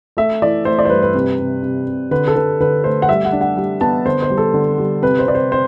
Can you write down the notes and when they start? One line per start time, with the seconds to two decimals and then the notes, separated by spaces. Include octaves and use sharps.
0.17 A3 E5
0.42 E3 D5
0.65 A3 C5
0.79 D5
0.85 C5
0.90 G2 B4
1.03 B4
1.15 C3
1.39 C3
1.63 C3
1.87 C3
2.11 D3 B4
2.28 A4
2.36 D3 B4
2.60 D3 B4
2.84 A3 C5
3.02 F#5
3.09 G3 E5
3.25 F#5
3.32 D4
3.41 F#5
3.57 G3
3.81 B3 A5
4.06 D3 C5
4.22 C5
4.30 G3
4.37 A4
4.54 D3
4.78 G3
5.02 C3 B4
5.19 C5
5.27 C3 D5
5.35 C5
5.51 C4 C5